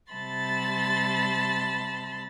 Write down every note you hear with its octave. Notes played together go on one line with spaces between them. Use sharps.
C3 G3 A5 B5 C6 A6